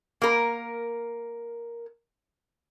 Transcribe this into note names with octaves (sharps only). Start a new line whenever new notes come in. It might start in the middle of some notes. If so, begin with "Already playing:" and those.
A#3 A#4